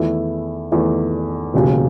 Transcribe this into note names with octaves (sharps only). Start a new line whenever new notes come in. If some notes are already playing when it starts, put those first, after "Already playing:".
Already playing: E2 D#3 A3 E4
E2 D#3 A3 E4
E1 D#2 C#3 F#3